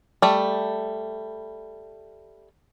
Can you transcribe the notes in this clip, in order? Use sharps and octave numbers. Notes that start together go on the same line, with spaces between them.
G3 A3